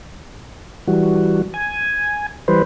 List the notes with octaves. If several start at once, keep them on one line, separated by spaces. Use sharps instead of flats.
E3 G3 F#4
G#5
E3 G3 B4 C5